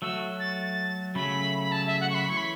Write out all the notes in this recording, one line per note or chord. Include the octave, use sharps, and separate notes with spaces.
F#3 A3 F#4 E6
A6
A6
C#3 F#3 A3 C#4 B5
B5
A5
E5
F#5
C#6
B5
E3 A3 E4 C#5 C#6
B5